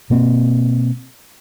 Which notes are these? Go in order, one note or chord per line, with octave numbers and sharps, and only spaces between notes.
B2 A#3 C4